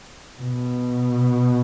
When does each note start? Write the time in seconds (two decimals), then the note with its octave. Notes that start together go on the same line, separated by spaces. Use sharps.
0.40 B2